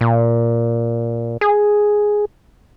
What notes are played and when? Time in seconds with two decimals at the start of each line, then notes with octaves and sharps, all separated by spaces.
0.01 A#2
1.41 G#4